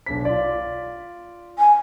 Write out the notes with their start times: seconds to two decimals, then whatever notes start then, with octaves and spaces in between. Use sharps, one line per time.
0.06 B1 D4 B6
0.25 F4 D5
1.59 G#5